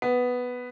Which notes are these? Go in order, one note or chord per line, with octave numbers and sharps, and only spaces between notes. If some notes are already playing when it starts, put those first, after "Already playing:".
B3